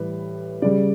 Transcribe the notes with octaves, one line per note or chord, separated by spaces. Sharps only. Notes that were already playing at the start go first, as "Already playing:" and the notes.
Already playing: A2 E3 G3 B4
C#3 G3 D5